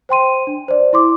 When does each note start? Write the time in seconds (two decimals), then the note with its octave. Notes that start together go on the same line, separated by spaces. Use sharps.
0.09 C5 G5 C6 D#7
0.47 D4
0.68 C5 D5
0.93 E4 C6 D6